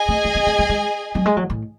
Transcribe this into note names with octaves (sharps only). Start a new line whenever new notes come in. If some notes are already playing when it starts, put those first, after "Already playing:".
Already playing: G#4 D#5 G#5
A3
A3
B3
A3
G#3
G#3
F#3
G#3
F#3
A2